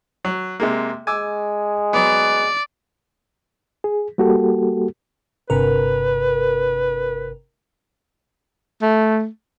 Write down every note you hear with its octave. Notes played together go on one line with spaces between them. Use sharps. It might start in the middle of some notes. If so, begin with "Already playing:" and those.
F#3
C3 G#3 A#3
G#3 G#5 D6 E6
F#3 B3 D5
G#4
G3 A#3 F#4 G4 A4
G1 C3 A#4 B4
A3